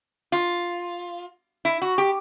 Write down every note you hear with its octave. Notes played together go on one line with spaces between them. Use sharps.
F4
E4
F#4
G4